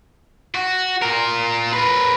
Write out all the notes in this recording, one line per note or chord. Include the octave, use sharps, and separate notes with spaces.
F#4
F4 A#4
A#4 B4